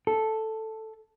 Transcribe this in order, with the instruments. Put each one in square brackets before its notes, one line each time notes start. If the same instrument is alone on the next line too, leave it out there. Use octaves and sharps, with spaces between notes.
[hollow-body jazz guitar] A4